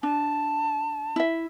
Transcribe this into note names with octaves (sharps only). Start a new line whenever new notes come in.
D4 A5
E4 E5